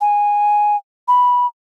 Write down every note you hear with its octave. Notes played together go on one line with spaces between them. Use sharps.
G#5
B5